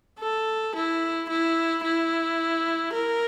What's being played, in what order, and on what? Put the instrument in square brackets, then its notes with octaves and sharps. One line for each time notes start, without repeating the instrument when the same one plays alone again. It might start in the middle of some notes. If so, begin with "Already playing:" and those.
[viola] A4
E4
E4
E4
A#4